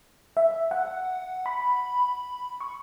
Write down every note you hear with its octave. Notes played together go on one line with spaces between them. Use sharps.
E5
F#5
B5
C#6